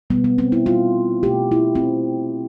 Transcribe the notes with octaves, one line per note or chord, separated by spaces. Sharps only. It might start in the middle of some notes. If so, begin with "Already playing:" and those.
B2 G3 B3
B3
C4
E4
B2 G3 B3 F4
B2 A3 G4
E4
C4